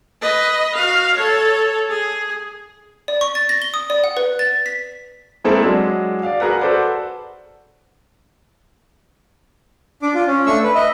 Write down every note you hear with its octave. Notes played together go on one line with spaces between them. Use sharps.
B4 D#5
F#4 F5
A4 C#5
G#4
D5
C#6
A6
A#6
G7
D#6
D5
F#5
B4
A6
B6
G#3 A#3 C4 E4 G#4 A4
F#3 G#3 D4 F#4
D5 F5
F#4 G#4 A#4 B4 F#5
F#4 A4 B4 C5 D5
D4 D6
F4
C#4
A3 D4 C#6 E6
B4
D#5 E5